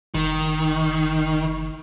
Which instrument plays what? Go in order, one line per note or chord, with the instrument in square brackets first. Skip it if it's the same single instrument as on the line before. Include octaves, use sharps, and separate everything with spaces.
[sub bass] F#1 [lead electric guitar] D#3